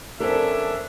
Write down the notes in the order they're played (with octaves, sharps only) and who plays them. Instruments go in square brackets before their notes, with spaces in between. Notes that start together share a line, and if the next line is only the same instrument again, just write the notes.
[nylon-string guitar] F2 A4 A#4 [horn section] C#4 D4 E5